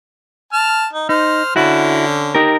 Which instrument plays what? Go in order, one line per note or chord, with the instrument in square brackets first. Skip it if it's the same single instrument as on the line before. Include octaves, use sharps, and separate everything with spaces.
[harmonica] A5 F6
D#4
[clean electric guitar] D#4 [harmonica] C5 F6
[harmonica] D3 C#4 [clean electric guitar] E4 F#4
[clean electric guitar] D#4 G4 A#4